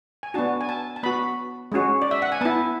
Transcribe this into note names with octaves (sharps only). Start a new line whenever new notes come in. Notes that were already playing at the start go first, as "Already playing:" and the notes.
G#5
B3 D4 F#4 A5
G#5
A5
A5
B3 F#4 B5
G#3 C#4 F#4
D5
E5
F#5
G#5
B3 E4 A5